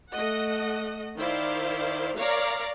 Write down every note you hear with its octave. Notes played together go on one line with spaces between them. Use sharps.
A3 D#5 F#5
D#3 E4 C5 D5 F5
A#4 C#5 D5 F5 A#5